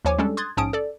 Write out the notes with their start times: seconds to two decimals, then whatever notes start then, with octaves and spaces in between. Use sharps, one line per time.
0.05 D#2 F3 C#5 G#5 D6
0.18 G3 G#3 C#4 D4 A4
0.37 C6 D#6 F#6 G#6 A6
0.57 A#1 G#2 C#4 A5 D#6 D7
0.73 A4 D5